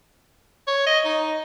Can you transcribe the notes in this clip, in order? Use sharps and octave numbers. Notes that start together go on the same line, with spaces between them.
C#5
D#5
D#4